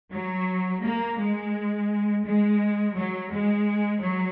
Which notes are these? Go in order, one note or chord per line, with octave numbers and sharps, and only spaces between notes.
F#3
A#3
G#3
G#3
F#3
G#3
F#3